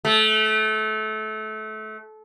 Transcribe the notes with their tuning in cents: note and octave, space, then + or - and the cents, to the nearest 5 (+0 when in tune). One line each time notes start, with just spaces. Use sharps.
A3 -25